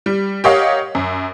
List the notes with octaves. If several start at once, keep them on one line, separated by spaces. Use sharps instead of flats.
G3
G4 A#4 C#5 D#5 F5 F#5
F#2